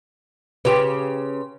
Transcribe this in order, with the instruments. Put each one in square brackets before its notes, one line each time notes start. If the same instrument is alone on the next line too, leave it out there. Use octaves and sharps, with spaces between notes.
[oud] C#3 G4 [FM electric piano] B4 C6